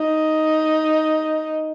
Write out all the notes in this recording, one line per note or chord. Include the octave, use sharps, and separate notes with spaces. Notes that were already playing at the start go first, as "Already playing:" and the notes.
Already playing: D#4